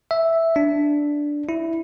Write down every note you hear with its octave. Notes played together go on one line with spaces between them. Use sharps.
E5
D4
E4